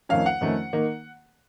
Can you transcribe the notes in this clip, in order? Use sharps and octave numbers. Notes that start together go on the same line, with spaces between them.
F2 D#3 A3 C#4 F5
F#5
F2 D#3 A3 C#4
D#3 A#3 D#4